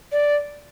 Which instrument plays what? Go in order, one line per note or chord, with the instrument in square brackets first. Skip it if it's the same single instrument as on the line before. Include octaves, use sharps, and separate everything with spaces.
[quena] D5